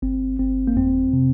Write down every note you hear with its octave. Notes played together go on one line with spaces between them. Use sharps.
G1 C4
G1 C4
A#3
F2 C4
C3